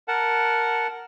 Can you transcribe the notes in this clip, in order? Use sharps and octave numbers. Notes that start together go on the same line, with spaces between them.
A#4 F#5 A5